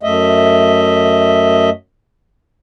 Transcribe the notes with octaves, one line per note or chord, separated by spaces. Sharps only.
F#2 A3 D#5 E5